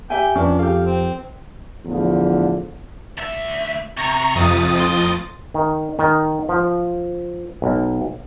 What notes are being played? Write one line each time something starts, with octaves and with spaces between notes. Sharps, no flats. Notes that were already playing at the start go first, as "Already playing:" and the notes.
G4 E5 G5 G#5
F2 C#4 D4 B4
G4 A4 F5
C4
E2 A2 D3 F3
D2 E5
C3 A#5 C#6
F2 D#6 A6
A2 C6
D#3
D#3
F3
B1